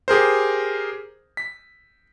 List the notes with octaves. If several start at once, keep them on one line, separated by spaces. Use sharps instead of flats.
G4 G#4 A#4 C5
B6